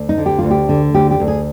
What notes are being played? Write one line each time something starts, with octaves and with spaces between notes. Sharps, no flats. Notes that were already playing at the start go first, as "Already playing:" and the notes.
Already playing: D2
D#4
D3
G4
D2 F4
G4
D3
D2 G4
G4
D2
G#4